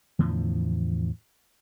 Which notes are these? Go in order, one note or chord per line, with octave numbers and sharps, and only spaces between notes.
E2 A2 D3 F3